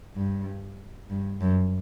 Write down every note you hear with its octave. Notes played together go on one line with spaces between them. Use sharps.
G2
G2
F#2